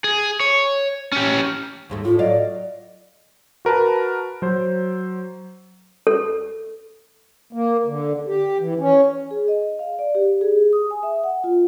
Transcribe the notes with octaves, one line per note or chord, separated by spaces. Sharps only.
G#4
C#5
C#4 G4
D#2 G#2 A3
A2 F4
F#3 D5 D#5 F5
F#4 A#4 B4 A5
F#3 C5
A4
A#3
D3
G4
E3
C#4
G#4
D#5
F5
D5
G4
G#4
D#6
G#5
E5
F#5
F4